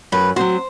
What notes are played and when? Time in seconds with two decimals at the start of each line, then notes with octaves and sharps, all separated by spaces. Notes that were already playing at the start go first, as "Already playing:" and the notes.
0.12 F#2 B4
0.36 F#3 C4 F#4 C5